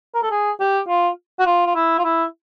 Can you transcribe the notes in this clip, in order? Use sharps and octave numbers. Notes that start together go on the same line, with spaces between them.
A#4
A4
G#4
G4
F4
F#4
F4
F4
E4
F4
E4